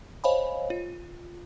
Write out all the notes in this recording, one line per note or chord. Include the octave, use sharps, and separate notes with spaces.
C5 C#5 D#5 F5 G#5 B5
F4